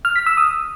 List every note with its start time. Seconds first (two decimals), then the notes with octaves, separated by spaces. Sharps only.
0.05 F6
0.16 B6
0.26 E6
0.37 D#6